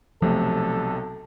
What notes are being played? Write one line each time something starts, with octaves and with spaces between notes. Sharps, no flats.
B1 C3 F3 A3 A4